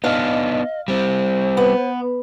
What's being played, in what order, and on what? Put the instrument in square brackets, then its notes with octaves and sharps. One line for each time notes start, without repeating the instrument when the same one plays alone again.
[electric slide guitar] B3 D4 D#4 [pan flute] D#5 [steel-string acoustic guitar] F5
[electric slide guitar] G3 C4 [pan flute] C5
[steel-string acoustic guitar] B3